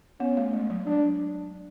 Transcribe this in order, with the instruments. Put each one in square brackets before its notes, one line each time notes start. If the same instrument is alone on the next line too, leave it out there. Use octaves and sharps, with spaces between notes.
[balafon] B3 [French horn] C#4
[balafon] A3
G#3
F#3
[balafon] F#3 [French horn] D4